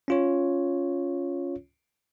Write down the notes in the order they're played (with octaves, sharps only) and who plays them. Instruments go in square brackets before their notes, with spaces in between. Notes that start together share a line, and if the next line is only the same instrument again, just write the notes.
[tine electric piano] C#4 F4 C#5